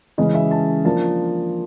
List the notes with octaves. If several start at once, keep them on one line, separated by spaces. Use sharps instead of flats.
C#3 E3 G#3 C#4 D#5
E5
A5
F3 A#3 D4 F4 A5